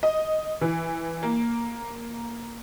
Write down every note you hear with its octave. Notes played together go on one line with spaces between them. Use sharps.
D#5
E3
A#3